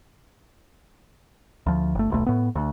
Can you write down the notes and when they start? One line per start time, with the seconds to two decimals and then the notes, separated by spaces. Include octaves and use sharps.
1.66 D2 F3
1.95 G1 A3
2.10 D#1 B1 A3
2.26 A2 B3
2.55 D2